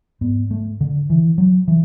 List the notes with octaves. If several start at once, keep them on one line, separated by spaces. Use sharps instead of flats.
G#2 B3
A3
D3
E3
F#3
E3